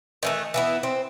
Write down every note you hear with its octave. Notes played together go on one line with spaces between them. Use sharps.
D#3 E3 A3
E3 B3 E4
C4